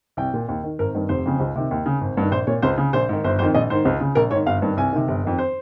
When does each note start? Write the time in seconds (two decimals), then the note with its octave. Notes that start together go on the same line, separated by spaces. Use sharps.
0.17 C2 G5
0.34 A#2
0.48 D#2
0.64 D#3
0.79 G#1 A#4
0.95 G2 D#3
1.09 F1 C5
1.25 F2 C#3
1.40 C#2
1.55 C3 D#3
1.71 D#2
1.86 C#3
2.01 G#1
2.17 G2 D#3
2.32 A#1 C5
2.47 A#2 C#5
2.62 C#2 C5
2.77 C#3
2.93 A#1 C5
3.09 G#2 D#3
3.24 G1 C5
3.39 F2 D#3 C5
3.54 A#1 D#5
3.70 G#2 D#3 C5
3.85 C#2
4.00 C#3
4.15 A#1 A#4
4.31 G#2 C#5
4.34 D#3
4.46 G1 F5
4.62 G2 D#3
4.77 C2 G#5
4.93 C3 D#3
5.08 G1
5.24 F2 D#3
5.38 C5